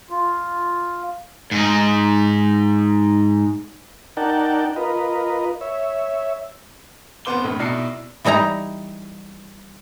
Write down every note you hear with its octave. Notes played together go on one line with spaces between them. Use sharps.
F4
G#2 D#4
D#4 A#4 D5 F#5 G5 A5
F4 A#4 B4 D#5
C#5 E5
F1 B3 C5 D6 G7
A#1 A2
B1 B2 E4 D5 C7 C#7
E3 G3 D#4 E4 A#5